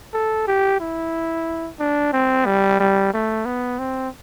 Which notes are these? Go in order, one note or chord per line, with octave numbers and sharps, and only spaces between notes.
A4
G4
E4
D4
C4
G3
G3
A3
B3
C4